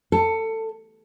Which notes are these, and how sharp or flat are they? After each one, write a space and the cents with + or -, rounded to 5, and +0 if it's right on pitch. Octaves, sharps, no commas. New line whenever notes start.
A4 +20